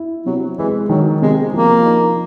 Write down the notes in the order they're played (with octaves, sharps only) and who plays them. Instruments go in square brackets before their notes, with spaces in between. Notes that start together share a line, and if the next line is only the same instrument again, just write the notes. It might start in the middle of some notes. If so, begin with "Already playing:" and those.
Already playing: [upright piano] E4
[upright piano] C3 [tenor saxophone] F#3
[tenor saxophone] E3 [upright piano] G#3
[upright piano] D#3 [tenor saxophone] F#3
[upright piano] C3 [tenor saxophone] G#3
[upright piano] F3 [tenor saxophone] A#3
[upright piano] D#4